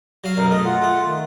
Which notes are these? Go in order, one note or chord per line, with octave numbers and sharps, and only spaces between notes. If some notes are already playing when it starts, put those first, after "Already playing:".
F#3 F5
B1 F#2 A#4
A3 D#5
F4 F#5
A3
D#3